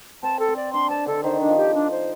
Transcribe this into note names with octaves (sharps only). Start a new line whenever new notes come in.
C4 A5
A4
C4
D5
D4 C6
C4 A5
D3 A4
D#3 C5
D#3 D4
F3
G4
D4
C5